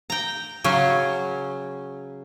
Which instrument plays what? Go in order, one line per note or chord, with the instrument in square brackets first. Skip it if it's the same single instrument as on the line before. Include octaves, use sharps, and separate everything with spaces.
[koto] G5 A#5
C#3 F#3 C#4